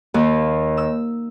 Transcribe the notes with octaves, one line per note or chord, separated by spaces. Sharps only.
D#2
E6